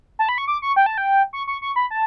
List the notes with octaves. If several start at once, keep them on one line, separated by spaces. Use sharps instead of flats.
A5
B5
C#6
D6
C#6
G5
A5
G5
C#6
C#6
C#6
B5
A5